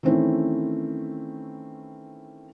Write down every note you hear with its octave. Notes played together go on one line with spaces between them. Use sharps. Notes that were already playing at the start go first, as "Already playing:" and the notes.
D#3 E3 A3 C4 C#4 E4